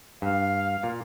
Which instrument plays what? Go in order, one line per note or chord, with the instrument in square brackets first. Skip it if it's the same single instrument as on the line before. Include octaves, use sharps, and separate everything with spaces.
[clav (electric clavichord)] G2 [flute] F5
[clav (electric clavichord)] A#2